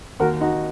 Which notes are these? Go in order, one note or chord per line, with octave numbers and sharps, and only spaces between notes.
D#2 F#4 A#4
D#4 F#4